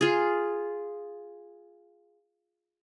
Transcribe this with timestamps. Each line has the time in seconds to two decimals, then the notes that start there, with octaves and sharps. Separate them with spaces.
0.01 F4 G#4